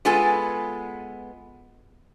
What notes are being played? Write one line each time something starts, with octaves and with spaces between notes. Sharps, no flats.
G#3 B3 F4 A4 G#5